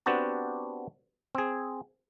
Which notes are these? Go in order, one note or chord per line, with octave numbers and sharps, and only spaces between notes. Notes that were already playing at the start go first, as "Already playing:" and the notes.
B3 C4 D4 F#4 G4 A5
C4 G#4